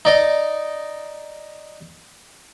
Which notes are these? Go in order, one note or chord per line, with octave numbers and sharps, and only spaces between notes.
D#4 D5 D#5